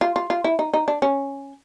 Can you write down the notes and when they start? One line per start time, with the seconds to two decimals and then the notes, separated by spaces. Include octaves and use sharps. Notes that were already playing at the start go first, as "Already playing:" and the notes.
0.01 F4
0.16 F4
0.30 F4
0.44 E4
0.59 D#4
0.74 D#4
0.88 D4
1.02 C#4